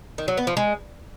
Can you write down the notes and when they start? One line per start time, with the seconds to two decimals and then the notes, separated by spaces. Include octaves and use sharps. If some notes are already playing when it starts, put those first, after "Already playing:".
0.18 D#3
0.28 F#3
0.37 B3
0.47 F3
0.57 G#3